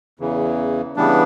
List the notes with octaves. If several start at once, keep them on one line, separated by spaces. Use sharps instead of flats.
E2 C#3 E3
C#3 E3 G3 B3 D4